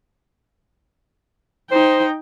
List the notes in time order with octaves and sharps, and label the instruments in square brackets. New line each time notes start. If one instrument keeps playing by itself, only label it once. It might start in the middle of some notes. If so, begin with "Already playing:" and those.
[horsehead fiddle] D#4 G5 [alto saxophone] C5